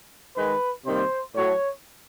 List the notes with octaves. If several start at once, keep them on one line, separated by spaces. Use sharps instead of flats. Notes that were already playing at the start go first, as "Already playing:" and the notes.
G#2 D#3 G#3 B4
C3 D#3 G3 A#3 C5
A2 F#3 A3 C#5